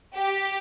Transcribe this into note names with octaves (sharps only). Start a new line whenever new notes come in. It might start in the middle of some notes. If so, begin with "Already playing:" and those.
G4